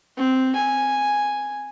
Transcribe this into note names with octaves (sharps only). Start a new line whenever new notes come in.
C4
G#5